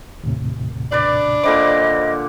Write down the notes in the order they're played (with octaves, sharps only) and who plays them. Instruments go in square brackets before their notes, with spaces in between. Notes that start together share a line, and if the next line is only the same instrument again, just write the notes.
[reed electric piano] D#2 A2 C3
[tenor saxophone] D4 [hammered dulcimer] B4 D5
[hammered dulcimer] A#2 D3 D6 [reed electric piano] C5 B5 [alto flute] D#5